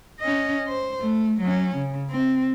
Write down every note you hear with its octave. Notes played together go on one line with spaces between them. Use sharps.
C#4 D#5
C5
A3
F#3 C#4
C#3
C4